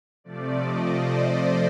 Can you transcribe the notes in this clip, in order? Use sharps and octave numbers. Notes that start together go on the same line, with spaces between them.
C3 F3 A3 D5
D#5
C5
D5